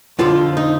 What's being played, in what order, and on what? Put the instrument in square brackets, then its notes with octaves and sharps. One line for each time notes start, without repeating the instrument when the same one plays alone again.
[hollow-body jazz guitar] F2 D3 F3 F4
D#4